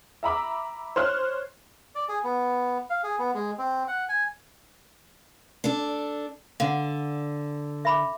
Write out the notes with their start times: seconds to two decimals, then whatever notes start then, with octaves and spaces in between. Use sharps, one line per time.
0.23 E5 A#5 B5 D6
0.96 C5 C#5 C6 F6 F#6
1.95 D5
2.08 G#4
2.24 B3
2.90 F5
3.03 G#4
3.19 B3
3.34 G#3
3.58 C4
3.88 F#5
4.09 G#5
5.64 D4 A4
6.60 D3 F5 F#5
7.85 E5 B5 D6